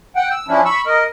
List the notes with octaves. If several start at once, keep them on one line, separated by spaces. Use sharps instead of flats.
F#5 G5
E6
F3 C#4 D4 E4
B5 C#6 E6
A#4 D#5